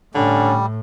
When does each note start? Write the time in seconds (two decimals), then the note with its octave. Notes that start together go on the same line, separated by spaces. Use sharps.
0.15 A2 D3 G3 C#4